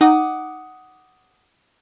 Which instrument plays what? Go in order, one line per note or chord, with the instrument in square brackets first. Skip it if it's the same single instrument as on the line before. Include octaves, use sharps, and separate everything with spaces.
[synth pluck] D#4 [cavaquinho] F#5 D6 D#6